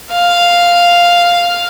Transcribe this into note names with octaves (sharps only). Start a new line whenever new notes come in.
F5